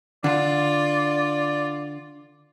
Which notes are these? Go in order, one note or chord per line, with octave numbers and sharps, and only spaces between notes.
D3 F4 D5